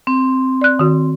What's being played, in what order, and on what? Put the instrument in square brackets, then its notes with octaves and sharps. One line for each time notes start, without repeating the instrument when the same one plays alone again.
[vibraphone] C4
[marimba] D5 F#6
D#3 F#4